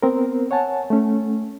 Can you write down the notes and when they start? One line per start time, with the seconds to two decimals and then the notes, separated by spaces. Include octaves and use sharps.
0.02 B3 C4 A#4
0.51 C#5 F#5 G#5 A5
0.90 A3 C#4